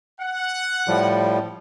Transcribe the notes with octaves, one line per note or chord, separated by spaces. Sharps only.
F#5
A2 F3 G3